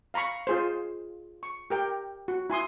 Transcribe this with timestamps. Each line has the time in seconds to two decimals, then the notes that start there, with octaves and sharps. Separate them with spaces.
0.14 F5 A#5 B5 C#6
0.47 F4 G#4 C5
1.43 C#6
1.70 G4 A#4 G5
2.28 F#4
2.50 E4 G#5 C6 D#6